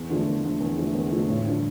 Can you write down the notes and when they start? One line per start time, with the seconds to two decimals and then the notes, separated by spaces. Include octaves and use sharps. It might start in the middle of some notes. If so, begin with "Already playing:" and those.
Already playing: E2
0.10 D3 F3 A3
0.27 E2
0.44 D3 F3 A3
0.60 E2
0.78 D3 F3 A3
0.95 E2
1.11 D3 F3 A3
1.28 A1
1.45 G2 D3 F3